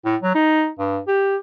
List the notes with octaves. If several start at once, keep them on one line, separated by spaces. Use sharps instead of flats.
A2
F#3
D#4
G2
G4